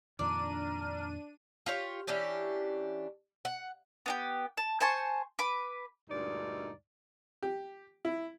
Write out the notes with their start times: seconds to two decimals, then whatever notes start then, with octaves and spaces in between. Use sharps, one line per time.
0.19 F2 A#2 D#3 D4 D5 A#5 F6 D#7
1.66 F4 G4 C#5
2.07 E3 C#4 D4 G4
3.45 F#5
4.06 B3 D4 G4
4.57 A5
4.80 C5 G#5 A5 C#6
5.39 B4 D6
6.09 D2 G2 A#2 G#3 D#4 D5
7.43 G4
8.05 E4